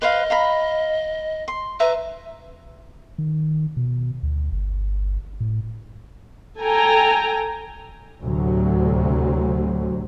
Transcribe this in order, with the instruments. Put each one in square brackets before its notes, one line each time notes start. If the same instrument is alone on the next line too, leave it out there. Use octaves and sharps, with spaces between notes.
[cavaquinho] B4 C5 F5 [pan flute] D#5
[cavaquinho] F5 A#5 B5
C6
[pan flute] B4 [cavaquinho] E5 A#5
[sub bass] D#3
B2
D2
G1
A2
[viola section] A4 G5 G#5 A#5
[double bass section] D2 A2 C3 F#3